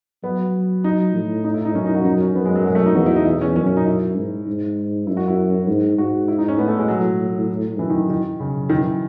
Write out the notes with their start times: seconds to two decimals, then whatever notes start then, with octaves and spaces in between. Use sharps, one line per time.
0.24 F#3 B3
0.84 D#4
1.15 A2
1.44 D#4
1.54 E4
1.65 D#4
1.75 F#2 C#4
1.86 D#4
1.95 F#4
2.05 F#2 D#4
2.20 C#4
2.35 F#2 B3
2.45 G#3
2.55 F#3
2.66 G#3
2.75 A3
2.86 D#4
2.95 E2 F#4
3.06 E4
3.16 D#4
3.26 E4
3.41 C#4
3.56 F#2 C#4
3.66 C#4
3.77 D#4
3.87 E4
4.17 G#2
4.47 G#2
5.07 F#2 E4
5.17 F#4
5.28 E4
5.68 G#2
5.98 G#2 F#4
6.28 E4
6.38 D#4
6.48 C#4
6.58 A2 B3
6.68 A3
6.78 G#3
6.88 F#3
7.79 F#2 E3
7.89 D#3
8.10 D#3
8.39 F#2 C#3
8.69 D#3
8.80 E3